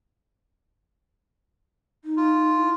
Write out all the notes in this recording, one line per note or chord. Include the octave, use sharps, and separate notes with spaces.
D#4
F4
E4